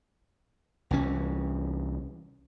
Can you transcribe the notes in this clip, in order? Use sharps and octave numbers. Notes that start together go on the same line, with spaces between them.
C2 E3 C#4